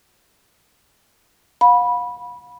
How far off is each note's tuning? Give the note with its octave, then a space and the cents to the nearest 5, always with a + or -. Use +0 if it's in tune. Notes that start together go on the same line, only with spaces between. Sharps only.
F5 +40 B5 -15